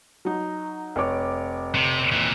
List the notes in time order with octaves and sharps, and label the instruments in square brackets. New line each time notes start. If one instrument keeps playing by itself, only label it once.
[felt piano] F#3 D#4
F1 C#5 D6
[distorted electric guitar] C3
A#2 E3